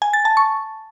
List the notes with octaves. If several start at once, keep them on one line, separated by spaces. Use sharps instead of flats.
G#5
A6
A5
C#6